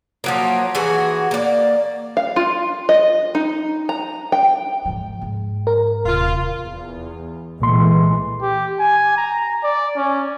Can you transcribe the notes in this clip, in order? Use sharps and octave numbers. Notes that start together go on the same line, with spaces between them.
F3 F#3 A#3
E3 F#4 G#4
A#3 D5
F5
F4
D#5
D#4
A#5
G5
G#2 F3
G#2
A#4
D#1 C3 F4
E2
C2 A#2 E3 G#3 A3 C6
G4
G#5
A#5
D5
C#4